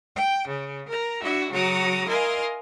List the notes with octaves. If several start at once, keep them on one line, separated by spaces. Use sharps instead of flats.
G5
C#3
A#4 A#5
D4 E4 F#4 E5
C#3 F#3 F#4 A#5 D6 D#6
E4 A#4 D#5 F5 G#5 C6